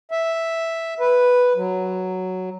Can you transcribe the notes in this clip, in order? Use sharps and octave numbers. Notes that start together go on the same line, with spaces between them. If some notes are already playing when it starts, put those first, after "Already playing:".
E5
B4
F#3